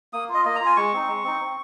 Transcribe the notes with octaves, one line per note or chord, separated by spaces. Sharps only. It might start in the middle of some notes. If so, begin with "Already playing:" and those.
A#3 D#6
F4
D#5
A#3 D#5
A#5
F4
G#5
G#3 C#6
C4 D#4
G#3
C4 D#4
C4